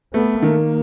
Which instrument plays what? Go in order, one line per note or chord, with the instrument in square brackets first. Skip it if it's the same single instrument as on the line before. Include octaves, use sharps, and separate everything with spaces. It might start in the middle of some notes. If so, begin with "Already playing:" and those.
[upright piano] A3 [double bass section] B3
[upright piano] D#3 [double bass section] A#3